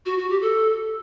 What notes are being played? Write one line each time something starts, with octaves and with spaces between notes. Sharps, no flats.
F#4
F#4
G4
A4